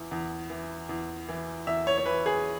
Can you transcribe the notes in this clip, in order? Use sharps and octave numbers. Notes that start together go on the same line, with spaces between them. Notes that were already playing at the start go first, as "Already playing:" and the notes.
Already playing: E2 E3
E2
E3
E2
E3
E2 E5
C#5
C#5
E3 B4
G#4